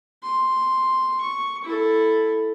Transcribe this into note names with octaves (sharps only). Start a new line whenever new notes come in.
C6
C#6
E4 A4